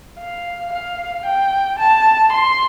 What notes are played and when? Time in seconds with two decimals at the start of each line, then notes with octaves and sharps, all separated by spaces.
0.19 F5
0.73 F5
1.26 G5
1.79 A5
2.32 C6